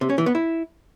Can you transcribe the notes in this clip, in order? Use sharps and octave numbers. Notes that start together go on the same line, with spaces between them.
C3
C#4
E3
B3
E4